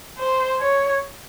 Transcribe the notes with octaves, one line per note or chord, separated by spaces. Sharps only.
C5
C#5